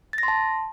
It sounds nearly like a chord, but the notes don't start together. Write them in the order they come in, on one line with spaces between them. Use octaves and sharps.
A6 A#6 C6 A5